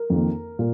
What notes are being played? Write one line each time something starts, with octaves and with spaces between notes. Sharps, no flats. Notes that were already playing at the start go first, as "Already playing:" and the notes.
Already playing: A#4
F2 D#3 A#3
A#2